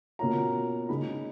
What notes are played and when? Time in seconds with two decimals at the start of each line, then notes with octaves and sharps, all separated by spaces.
0.19 B2 A#3 C#4 F4 A#5
0.89 C#3 G#3 D#4 B5